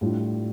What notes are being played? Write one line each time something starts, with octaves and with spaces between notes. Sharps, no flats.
A2 G3 D4 F4